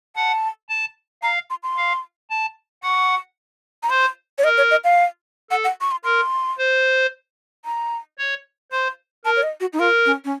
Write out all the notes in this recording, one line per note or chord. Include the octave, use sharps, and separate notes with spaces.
F#5 A5
A5
F5 A#5
C6
C6
F5
A5
F#5 C#6
A#5
C5 C6
C#5
A#4 D#5
C#5
D#5
F5
A4 F#5
F#5
C#6
C6
A#4 C6
C5
A#5
C#5
C5 C6
A#4 A5
C#5
D#5
F#4
D#4
F4 A#4
C#4
C#4